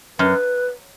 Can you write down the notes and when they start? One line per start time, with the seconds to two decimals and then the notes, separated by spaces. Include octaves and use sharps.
0.19 F#2 B4